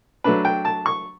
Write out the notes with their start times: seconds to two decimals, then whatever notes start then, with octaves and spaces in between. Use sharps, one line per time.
0.24 F#3 A3 D4 B4
0.45 G5
0.65 A5
0.86 C#6